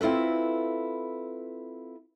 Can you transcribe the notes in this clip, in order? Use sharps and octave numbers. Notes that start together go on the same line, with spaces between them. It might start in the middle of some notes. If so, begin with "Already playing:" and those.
C4 E4 F4 A4 B4